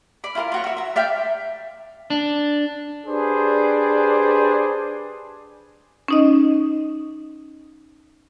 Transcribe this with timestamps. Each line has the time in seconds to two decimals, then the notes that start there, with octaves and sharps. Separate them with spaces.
0.24 D5 B5
0.35 E4 F4 A4 A#4
0.52 F4 F#4 C#5
0.64 F#4 E5
0.77 E5 A#5
0.96 D5 E5 F5 G5
2.10 D4
3.07 D4 G4 G#4 B4 C5 D5
6.08 C#4 D#4 D#5